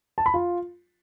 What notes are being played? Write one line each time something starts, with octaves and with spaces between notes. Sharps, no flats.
A5
B5
F4